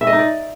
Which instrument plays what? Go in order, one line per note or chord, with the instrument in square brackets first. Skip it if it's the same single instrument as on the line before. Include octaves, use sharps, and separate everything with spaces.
[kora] E5
D#5
D#4
D5